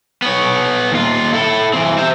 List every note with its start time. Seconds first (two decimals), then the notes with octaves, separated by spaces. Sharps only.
0.22 B3 C#5
0.92 D#2 F4
1.34 E4 A4
1.74 E3 C4
1.98 C5 E5